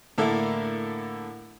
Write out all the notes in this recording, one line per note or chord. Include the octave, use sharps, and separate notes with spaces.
A2 D3 A#3 E4 A4